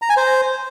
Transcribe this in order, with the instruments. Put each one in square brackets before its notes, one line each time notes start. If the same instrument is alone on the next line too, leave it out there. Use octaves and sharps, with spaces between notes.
[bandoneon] A#5
G#5
C5